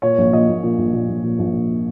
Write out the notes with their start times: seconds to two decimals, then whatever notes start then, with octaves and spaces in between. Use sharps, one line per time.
0.02 A#2 C#5
0.18 A#1
0.32 A#2 D#5
0.48 A#1
0.63 A#2
0.78 A#1
0.93 A#2
1.09 A#1
1.23 A#2
1.39 A#1
1.53 A#2